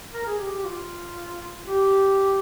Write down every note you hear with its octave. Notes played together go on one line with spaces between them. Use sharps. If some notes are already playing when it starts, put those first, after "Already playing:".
A#4
G#4
G4
G4
F4
G4